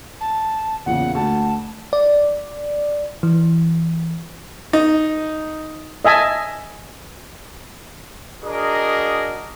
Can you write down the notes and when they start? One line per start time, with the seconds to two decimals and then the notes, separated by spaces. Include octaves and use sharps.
0.20 A5
0.86 E2 A#2 C#3 F#5
1.15 D2 A5
1.93 D5
3.23 E3
4.73 D#4
6.05 D#5 E5 G#5 A5
8.44 D4 F#4 G#4 A#4 D#5